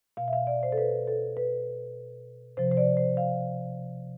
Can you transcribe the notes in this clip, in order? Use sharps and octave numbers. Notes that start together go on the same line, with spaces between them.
B2 F5
E5
F5
D5
C5
A4
B4
A4
B4
C3 F3 C5
C5
D5
C5
F5